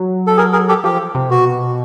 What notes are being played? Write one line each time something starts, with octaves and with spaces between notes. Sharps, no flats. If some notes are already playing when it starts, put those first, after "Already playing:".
Already playing: F#3
A4
G#4 A#4
G#4 A#4
G4 A4
F3 G4
C3
B2 F#4